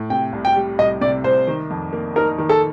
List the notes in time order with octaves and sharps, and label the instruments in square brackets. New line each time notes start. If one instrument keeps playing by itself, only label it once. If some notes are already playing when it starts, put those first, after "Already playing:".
Already playing: [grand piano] A2
[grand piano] C3 [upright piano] G5
[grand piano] C2
[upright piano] G5
[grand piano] G3
[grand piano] C2 [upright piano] D#5
[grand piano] C3 [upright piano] D5
[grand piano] C2 [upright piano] C5
[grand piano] D#3
F2
A#3
[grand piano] D#4 [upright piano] A#4
[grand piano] D#3
[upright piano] A4